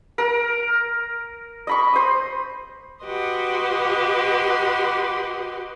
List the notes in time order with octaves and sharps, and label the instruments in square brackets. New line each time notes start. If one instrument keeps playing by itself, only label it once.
[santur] A#4
D#5 B5 C#6
C5 D#6
[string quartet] F#4 G4 B4 D#5 C6